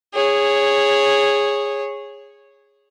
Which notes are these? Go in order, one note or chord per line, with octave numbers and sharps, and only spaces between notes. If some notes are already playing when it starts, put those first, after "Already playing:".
G#4 C#5